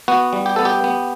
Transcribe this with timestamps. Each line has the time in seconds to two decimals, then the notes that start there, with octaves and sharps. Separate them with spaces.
0.08 B3 F#4
0.33 G3
0.46 G4
0.56 B3 A4
0.65 G4
0.84 B3